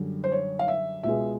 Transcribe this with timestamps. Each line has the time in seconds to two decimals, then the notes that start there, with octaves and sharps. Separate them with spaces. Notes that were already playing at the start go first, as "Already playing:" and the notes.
Already playing: F#2 D3 G3
0.24 C5
0.32 C#5
0.59 F5
0.68 E5
1.03 C#2 B2 G#3 E5